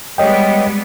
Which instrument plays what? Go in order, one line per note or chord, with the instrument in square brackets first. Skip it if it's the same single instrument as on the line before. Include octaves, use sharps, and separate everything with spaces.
[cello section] G3 G#3 B3 [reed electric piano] C#5 D#5 G5